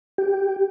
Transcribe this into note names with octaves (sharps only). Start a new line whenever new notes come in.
G4